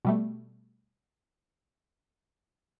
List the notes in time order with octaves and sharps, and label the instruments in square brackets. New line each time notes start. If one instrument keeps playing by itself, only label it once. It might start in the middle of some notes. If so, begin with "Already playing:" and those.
[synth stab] B2 G3 A3